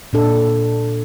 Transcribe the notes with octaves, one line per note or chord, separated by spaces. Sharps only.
A#2 D4 A4